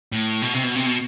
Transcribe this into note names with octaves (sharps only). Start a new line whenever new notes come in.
A2
B2
C3
B2
C3
B2